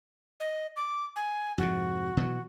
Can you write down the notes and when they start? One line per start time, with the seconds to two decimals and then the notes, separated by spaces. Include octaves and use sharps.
0.40 D#5
0.76 D6
1.16 G#5
1.58 F2 G#2 C3 F#4
2.17 B2 E3 F#3